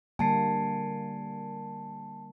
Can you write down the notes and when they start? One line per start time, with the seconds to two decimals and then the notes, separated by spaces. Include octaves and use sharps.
0.19 D3 G3 A#3 G#5 A5 C7